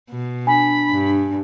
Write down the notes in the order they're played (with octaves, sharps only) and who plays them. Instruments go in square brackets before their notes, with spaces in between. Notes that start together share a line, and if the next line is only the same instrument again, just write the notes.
[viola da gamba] B2
[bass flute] D4 [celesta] G#5 [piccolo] B5
[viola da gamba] G2